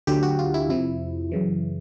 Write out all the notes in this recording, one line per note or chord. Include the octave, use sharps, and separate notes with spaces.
D2 D3 F#3 G4
F#4
F4
E4
F2 C3 F3 E4
F#2 C#3 E3